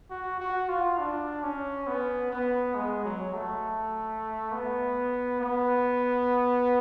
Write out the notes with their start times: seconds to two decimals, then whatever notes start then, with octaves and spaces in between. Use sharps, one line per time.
0.10 F#4
0.40 F#4
0.69 F4
0.99 D4
1.43 C#4
1.87 B3
2.31 B3
2.75 G#3
3.05 F#3
3.34 A3
4.52 B3
5.41 B3